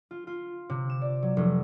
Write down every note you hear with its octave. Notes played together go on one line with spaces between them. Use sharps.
F4
F4
C3
E7
D5
F#3
F1